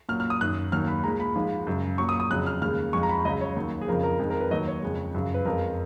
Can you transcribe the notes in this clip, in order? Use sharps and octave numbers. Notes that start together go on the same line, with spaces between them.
A#2 F#3 F6
F6
D#6
F#2 D#3 F#3 F#6
D#2 D#3 F#3 F6
B5
A#2 G#3 A#5
B5
G#2 F3 G#3
F#2 C#3 G#3
A#2 F#3 C#6
D#6
D#6
F2 C#3 F#3 F#6
F6
D#2 C#3 G#3 F6
F2 F3 G#3 C#6
A#5
B5
C#2 C#3 F#3 D#5
C#5
D#2 D#3 F#3
G#4
F2 C#3 F3 A#4
A#4
F2 D#3 G#3
A#4
B4
D#2 D#3 F#3 D#5
C#5
F2 C#3 G#3
F#2 C#3 F3
B4
F2 F3 G#3 A#4